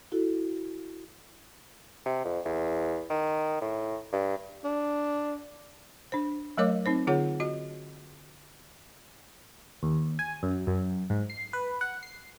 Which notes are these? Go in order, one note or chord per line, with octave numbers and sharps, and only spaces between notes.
E4 F#4 A4
C3
F2
E2
D#3
A2
G2
D4
D4 C5
F#3 A3 A#4 C#5 D#5 D6
C4 D#4 C5
D3 F4 G#4 C#5 F#5
F#4 D#5
D#2
G#5
F#2
F#2
G#2
C7
B4
F#5
C7